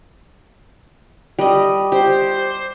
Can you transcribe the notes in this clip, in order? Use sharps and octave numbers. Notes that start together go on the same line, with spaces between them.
G3 D#5
G4 C5